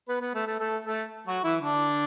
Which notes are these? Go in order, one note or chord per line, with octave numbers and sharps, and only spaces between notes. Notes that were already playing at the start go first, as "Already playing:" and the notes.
B3 B4
B3 B4
A3 A4
A3 A4
A3 A4
A3 A4
F#3 F#4
E3 E4
D3 D4